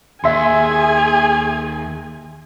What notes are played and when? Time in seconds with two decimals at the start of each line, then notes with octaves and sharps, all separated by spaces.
0.24 D#2 G#4 E5 G#5 C6